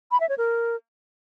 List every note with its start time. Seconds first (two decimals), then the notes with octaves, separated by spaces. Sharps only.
0.11 B5
0.20 E5
0.29 C#5
0.38 A#4